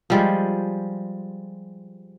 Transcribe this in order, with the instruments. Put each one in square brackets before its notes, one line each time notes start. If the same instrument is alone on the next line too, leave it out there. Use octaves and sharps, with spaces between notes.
[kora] F3 G3 G#3